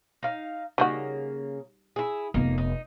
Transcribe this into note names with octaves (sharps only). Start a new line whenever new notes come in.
D#4 F5
C#3 G3 A#3 D#4 F#4
E4 G#4
F1 A#3 B3 D#4
D#4